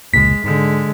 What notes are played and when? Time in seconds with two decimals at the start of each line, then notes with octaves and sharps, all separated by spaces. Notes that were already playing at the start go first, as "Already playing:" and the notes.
0.14 F1 C#2 A#2 G#3 B6
0.44 G#2 D3 G#3